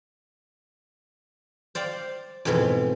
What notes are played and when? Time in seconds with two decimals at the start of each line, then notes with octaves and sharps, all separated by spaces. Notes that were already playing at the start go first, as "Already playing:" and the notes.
1.75 C5 D5 F5 G5
2.45 F2 G#2 B2 E3